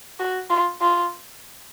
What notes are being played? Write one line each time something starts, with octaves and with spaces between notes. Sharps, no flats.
F#4
F4
F4